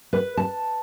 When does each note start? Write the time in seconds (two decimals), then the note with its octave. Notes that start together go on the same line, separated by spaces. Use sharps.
0.13 B4
0.37 A5